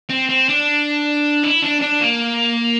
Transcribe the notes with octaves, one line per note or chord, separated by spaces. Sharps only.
C4
C4
D4
E4
D4
D4
A#3